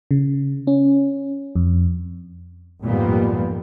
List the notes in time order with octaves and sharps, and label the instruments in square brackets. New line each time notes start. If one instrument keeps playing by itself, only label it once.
[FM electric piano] C#3
C#4
F2
[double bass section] G#1 F2 A#2 G3 A#3 B3